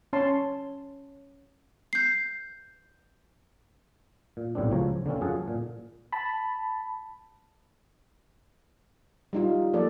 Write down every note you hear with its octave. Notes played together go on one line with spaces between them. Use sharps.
C#4 C#5 A5 C6
G6 C7
A#2
B1 A2 G3 C4 D4
C#2 F3 F#3 C5 C#5 A#5
D3 A#3 C4 C#4
F#2 F4 G#4 F#5 A5
A#2
A5 B5
G3 D#4 F4
F3 A#3 A4 D5